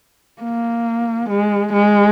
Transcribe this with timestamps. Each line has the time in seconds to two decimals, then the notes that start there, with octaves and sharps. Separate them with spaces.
0.42 A#3
1.30 G#3
1.73 G#3